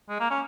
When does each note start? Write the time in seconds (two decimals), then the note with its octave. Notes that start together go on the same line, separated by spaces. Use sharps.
0.09 G#3
0.20 A#3
0.31 C#4